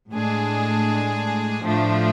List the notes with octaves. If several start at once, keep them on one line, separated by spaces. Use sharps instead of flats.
A2 G#3 D4 G#4
A2 F3 A3 D4